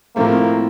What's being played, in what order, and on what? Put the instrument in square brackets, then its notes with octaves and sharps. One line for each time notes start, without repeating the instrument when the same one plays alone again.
[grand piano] A2 F3 A3 C4 [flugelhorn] A#3